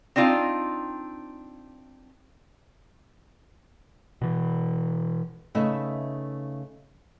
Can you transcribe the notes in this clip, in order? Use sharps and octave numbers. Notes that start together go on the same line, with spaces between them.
C4 D4 D#4 F4 F5
B2 E3
C#3 A3 D#4 B4 E5